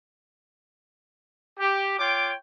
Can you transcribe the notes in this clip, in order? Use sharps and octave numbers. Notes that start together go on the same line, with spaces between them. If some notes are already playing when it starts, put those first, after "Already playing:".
G4
F4 C#5 G5 D6